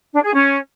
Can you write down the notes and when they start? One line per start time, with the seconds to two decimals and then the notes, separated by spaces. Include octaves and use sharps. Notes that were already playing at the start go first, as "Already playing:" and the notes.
0.13 D4
0.23 G#4
0.34 C#4